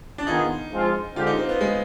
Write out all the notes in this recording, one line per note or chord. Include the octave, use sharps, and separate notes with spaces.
D4
D#3 B3 D#4 F4 G#4
F3 G#3 C4 F4 G#4
D3 G#3 C4 F4 G4
D#4
C4
B3
G#3